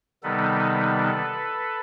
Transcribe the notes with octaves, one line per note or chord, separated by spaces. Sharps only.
C3 D#3 G3 B3 D#4 A4 B4